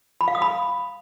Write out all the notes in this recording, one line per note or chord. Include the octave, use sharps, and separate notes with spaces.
B5
F5
D#6
B5